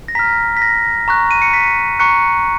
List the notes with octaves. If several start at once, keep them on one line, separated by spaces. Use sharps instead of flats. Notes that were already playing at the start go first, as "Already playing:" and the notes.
A#6
A#5 F6 B6
B6
A#6
A#5 C#6 F#6
D#7
C#7
B6
A#5 C#6 F#6 C#7